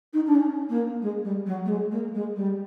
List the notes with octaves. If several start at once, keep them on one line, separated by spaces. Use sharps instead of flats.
D#4
D4
C#4
A#3
G#3
G3
F#3
A3
G#3
A#3
G#3
G3